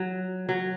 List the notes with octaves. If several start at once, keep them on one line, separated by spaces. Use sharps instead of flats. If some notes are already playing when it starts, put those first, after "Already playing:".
Already playing: F#3
F#3